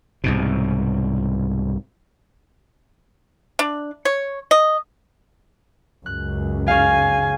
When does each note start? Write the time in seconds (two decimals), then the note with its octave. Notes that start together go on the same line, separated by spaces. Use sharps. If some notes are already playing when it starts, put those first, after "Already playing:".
0.24 C2 G#2 B2
3.59 D4
4.05 C#5
4.51 D#5
6.06 C#2 F#2 F#6
6.68 C#3 F5 G#5